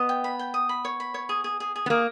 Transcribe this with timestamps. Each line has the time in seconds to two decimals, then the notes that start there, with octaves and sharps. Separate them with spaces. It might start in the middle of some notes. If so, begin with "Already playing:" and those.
Already playing: B3 D#5
0.09 G5
0.24 B5
0.39 G5
0.54 D#6
0.69 B5
0.85 C#5
1.00 B5
1.14 C#5
1.29 G#4
1.44 G#4
1.60 G#4
1.76 G#4
1.86 B3
1.90 A#3 G#4